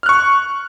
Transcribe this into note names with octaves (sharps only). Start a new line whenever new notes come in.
C#6 F6 F#6